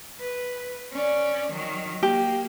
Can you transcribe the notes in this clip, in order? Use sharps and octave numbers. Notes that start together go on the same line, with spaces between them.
B4
C#4 D5
D#3 F#3
A#3 G4